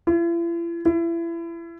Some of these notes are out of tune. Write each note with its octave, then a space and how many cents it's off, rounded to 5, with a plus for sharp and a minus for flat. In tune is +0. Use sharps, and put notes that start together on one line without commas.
E4 +45
E4 +30